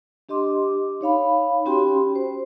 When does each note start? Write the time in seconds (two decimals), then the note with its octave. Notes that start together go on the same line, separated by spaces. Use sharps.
0.29 D4 G4 D#5 C6 D6
1.01 D#4 C#5 F5 B5
1.66 C#4 F#4 G4 G5 B5 C6
2.15 C5